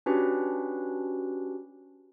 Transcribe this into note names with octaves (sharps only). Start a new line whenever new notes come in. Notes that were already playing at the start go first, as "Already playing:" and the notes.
C#4 D4 F#4 G4 B4